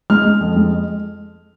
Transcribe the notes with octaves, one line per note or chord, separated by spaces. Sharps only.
G#3 F6
G#3
F2
G#3